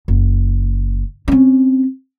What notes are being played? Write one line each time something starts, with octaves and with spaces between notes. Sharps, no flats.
F#1
C4 C#4